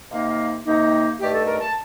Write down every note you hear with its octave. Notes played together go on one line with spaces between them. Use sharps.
C3 D#3 A#3 D#4 F5
F5
C3 D#3 A#3 D#4
G2 D#3 A3 G4
A4
A#4
A5